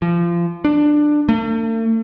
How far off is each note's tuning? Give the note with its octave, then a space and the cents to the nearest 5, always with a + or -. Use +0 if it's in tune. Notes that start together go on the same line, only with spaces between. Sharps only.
F3 -25
D4 +15
A3 +45